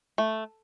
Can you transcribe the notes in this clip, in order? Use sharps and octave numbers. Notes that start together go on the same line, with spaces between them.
A3